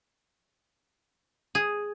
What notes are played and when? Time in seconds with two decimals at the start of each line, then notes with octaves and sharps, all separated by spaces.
1.55 G#4